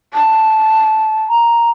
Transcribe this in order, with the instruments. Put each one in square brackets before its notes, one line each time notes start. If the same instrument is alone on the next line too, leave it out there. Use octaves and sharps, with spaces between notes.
[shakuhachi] A5
[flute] A#5